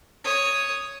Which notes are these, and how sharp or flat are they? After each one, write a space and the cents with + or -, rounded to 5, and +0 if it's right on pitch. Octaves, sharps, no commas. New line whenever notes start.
C#5 +0 D#6 +0